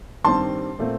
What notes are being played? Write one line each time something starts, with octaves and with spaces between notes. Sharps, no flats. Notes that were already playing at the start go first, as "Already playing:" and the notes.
G2 D#3 G3 C4 A5 C6
A#2 A3 C4